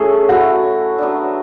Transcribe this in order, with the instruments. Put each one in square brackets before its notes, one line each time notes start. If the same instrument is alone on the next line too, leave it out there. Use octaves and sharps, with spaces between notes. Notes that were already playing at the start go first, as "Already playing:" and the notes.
Already playing: [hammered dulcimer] A2 F#3 A3 C#4 [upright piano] G#4 A4
[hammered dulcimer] F#3 A3 E4 A4 [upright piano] F#4
[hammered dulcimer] F#3 B3 D4